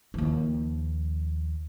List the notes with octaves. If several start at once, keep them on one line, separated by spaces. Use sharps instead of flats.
D#2 F3